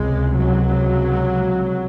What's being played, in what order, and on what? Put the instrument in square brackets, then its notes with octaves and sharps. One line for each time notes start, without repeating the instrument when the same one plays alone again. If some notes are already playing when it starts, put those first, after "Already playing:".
Already playing: [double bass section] C#2 C3 G#3
F#3